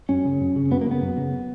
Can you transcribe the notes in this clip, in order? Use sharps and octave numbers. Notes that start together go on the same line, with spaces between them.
F#2 C#4
C#3
F#2
C#3
F#2 B3
A#3
C#3 B3
F#2
C#3